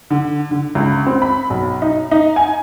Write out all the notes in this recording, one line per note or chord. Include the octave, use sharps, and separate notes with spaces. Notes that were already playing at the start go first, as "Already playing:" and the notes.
D3
D3
C#2
C4
B5
B1
D#4
D#4
G#5